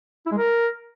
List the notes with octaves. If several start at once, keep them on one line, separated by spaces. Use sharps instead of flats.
E4
G#3
A#4